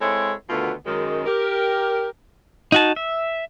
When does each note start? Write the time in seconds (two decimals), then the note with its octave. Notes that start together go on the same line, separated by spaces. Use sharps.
0.01 G#3 C4 E4 A4 C#5
0.49 D2 B2 D3 D#3 B3 F4
0.86 F#2 D#3 G#3
1.26 G4 A#4
2.72 D#4 F#4 A5
2.96 E5